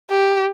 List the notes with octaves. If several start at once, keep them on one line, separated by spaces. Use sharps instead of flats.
G4